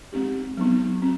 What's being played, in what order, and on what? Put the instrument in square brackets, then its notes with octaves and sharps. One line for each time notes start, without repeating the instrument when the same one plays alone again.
[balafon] G#3 C4 D#4 G4
F#3 B3 D#4
C4